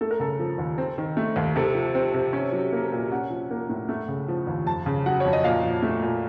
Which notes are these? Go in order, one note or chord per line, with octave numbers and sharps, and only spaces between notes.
A3 A4
A#4
C#3 A4
F3
D#2
C4
D#3
A3
D#2
C3 A4
F3
C4
C3
C#4
F#3
A#3
A#2
C#4 F#5
F3
A#3
A2
A3
C#3
F3
D#2
F2 A5
C#3
F#3 F#5
F2 C#5
D#5
A#2 F5
F3
A3
A#2